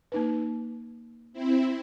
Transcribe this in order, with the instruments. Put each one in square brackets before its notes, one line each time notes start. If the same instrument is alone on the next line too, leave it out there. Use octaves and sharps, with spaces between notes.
[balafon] A#3 D#4 B4
[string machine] C4 E4